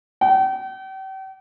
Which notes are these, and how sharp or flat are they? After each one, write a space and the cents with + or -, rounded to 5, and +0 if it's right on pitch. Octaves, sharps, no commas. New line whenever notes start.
G5 -40